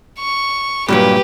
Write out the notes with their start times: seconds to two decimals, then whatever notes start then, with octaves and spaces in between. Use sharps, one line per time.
0.19 C#6
0.88 G2 A#2 F#3 G4 B4